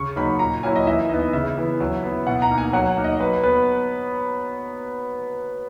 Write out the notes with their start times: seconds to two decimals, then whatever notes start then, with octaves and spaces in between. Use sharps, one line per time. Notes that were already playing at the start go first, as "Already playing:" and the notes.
Already playing: C#3 C#6
0.16 F#3 A#3 D#4 B5
0.39 A#2 A#5
0.63 F#3 A#3 C#4 E4 G#5
0.76 D#5
0.87 E3 E5
1.09 B3 D#4 D#5
1.33 C#3 E5
1.57 E3 B3
1.80 F#3
2.03 B3 E4
2.27 B2 F#5
2.42 A#5
2.51 A#3 D#4
2.58 G#5
2.73 F#3 F#5
2.97 A#3 D#4
3.04 D#5
3.20 F#3 B4
3.43 B3 B4